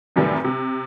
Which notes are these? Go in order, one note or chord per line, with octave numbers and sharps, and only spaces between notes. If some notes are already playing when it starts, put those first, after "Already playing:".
F#2 A2 C3 D#3 E3 G3
C3